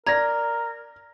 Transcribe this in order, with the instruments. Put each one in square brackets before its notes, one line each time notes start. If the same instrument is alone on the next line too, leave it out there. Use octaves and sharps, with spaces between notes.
[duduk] A#4 [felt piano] D5 A#6 [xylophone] A#5 G#6